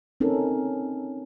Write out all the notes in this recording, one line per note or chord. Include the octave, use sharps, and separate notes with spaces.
C4 C#4 D#4 A4 A#4